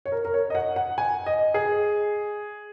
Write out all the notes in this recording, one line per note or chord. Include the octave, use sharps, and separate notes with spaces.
C#5
A#4
A#4
C#5
D#5
F#5
F#5
G#5
D#5
G#4